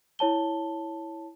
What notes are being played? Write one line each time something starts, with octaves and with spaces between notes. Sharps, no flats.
E4 C#5 A5 G7